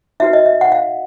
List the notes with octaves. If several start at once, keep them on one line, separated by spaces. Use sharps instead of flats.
D#4 F#4 B4 E5
D#5
E5
F#5
F5